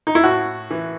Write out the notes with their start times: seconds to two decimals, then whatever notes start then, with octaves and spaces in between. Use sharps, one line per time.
0.07 D#4
0.15 E4
0.24 A2 F#4
0.71 E3